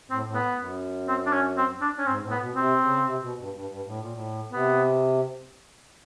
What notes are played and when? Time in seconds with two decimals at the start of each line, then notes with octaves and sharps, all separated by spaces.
0.10 A2 C4
0.27 A2
0.34 B3
0.59 F#2
1.08 C4
1.26 D4
1.33 C#4
1.57 C4
1.81 D4
1.98 C#4
2.06 G#2 C4
2.22 A2
2.31 B3
2.39 B2
2.55 C3 C4
2.79 C#3
3.04 C3
3.21 B2
3.38 G2
3.54 G2
3.69 G2
3.86 A2
4.00 A#2
4.13 A2
4.52 C3 B3